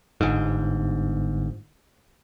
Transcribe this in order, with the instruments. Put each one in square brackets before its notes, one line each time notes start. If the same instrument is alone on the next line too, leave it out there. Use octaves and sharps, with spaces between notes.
[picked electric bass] G1 G#2